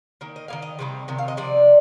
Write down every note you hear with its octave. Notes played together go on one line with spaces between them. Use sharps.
D#3 A#3
D#5
D#3 A#3 F5
D#5
C3 D#3 G3 A#3
C3 D#3
F5
D#5
C3 F3 D5